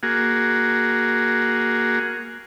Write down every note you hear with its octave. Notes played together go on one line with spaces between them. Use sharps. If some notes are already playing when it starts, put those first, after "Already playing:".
A#3 F#4 G#4